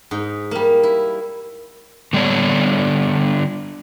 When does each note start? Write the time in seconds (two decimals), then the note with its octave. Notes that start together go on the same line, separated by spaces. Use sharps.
0.11 G#2 D#4
0.51 G3 A#3
0.83 E4
2.13 D3 G3 B3 D4 C#5